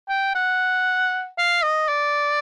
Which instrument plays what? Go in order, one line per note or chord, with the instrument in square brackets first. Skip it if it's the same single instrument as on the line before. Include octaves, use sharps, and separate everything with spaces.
[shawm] G5
F#5
F5
D#5
D5